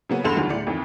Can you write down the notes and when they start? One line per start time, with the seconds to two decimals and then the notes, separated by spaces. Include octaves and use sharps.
0.09 C#3 F#3 A#3 B3 C#4
0.24 E2 G2 A4 C6 F7
0.36 D2 G2 D#3 F#3
0.50 A2 D5 C#7
0.67 F2 D#3 E3